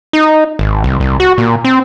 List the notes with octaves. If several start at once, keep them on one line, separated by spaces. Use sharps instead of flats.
D#4
G#1
C2
C2
F#4
A#2
C4